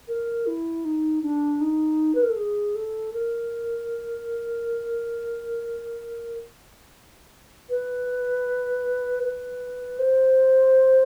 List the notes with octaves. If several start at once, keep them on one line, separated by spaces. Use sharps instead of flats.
A#4
E4
D#4
D4
D#4
B4
A#4
A4
G#4
A4
A#4
B4
B4
C5